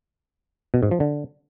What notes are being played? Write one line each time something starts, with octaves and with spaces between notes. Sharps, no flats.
B2
G#2
F3
D3